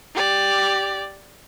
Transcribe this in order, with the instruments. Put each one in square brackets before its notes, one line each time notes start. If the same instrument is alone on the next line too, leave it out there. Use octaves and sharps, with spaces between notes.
[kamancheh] G4 D5